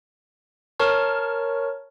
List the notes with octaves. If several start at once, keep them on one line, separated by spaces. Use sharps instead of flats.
A#4 C#5 A5 C#6 F6